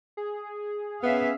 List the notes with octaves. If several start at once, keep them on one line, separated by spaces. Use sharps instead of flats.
G#4
B3 C#4 E5 F5